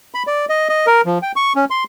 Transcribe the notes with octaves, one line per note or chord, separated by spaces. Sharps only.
B5
D5
D#5
D#5
A#4
F3
G5
C#6
C#4
C6